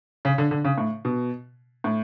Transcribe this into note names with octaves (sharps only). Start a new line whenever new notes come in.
C#3
D3
D3
C#3
A2
B2
A2